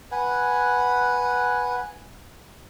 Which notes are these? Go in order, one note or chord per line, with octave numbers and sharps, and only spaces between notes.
B4 F#5 G#5